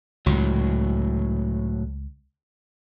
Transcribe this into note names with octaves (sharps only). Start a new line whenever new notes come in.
C#2 A2 F#3